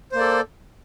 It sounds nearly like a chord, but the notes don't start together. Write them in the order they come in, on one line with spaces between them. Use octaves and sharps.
C5 A#3 D5 A4